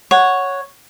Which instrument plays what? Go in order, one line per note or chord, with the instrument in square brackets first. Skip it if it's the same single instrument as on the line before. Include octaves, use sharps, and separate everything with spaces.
[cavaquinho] C#5 F#5